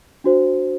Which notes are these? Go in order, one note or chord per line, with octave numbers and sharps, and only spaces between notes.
D4 F#4 C5